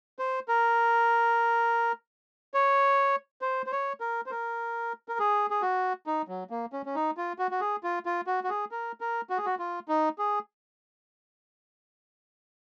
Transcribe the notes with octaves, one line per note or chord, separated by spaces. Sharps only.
C5
A#4
C#5
C5
C5
C#5
A#4
C5
A#4
A#4
G#4
G#4
F#4
D#4
F#3
A#3
C#4
C#4
D#4
F4
F#4
F#4
G#4
F4
F4
F#4
F#4
G#4
A#4
A#4
F#4
G#4
F#4
F4
D#4
G#4